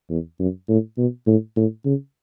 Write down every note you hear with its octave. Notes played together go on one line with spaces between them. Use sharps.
E2
F#2
A2
B2
A2
A2
C#3